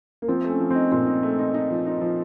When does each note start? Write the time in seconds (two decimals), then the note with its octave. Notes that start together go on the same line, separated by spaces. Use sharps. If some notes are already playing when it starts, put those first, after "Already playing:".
0.22 A#3
0.28 F3 C4
0.44 A3
0.49 C#4
0.60 F3
0.70 C4 D#4
0.92 A#2 C4
1.07 D#4
1.23 A3
1.39 D#4
1.54 D#4
1.71 F3
1.87 D#4
2.01 F3